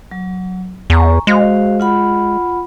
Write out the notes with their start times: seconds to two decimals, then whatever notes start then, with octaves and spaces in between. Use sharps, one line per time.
0.11 F#3
0.90 E2 G#5 A#5 C#6
1.27 G#3 F#4 C5 F5
1.80 F4 F#5 B5